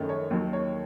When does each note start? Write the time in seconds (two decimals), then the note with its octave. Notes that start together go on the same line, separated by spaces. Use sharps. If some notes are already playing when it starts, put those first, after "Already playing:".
Already playing: F#2 D#3 A3 C#4
0.09 C#5
0.31 D#2 D#3 F#3
0.53 C#5